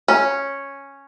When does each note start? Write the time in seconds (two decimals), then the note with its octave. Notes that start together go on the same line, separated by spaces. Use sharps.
0.08 C#4